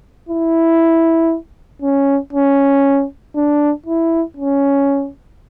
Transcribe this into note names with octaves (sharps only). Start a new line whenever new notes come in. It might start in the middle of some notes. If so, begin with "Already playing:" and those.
E4
C#4
C#4
D4
E4
C#4